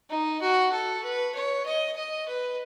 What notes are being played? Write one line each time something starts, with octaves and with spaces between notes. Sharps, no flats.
D#4
F#4
A4
B4
C#5
D#5
D#5
B4